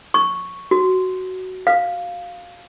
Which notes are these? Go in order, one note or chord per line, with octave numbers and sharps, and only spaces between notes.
C#6
F#4
F5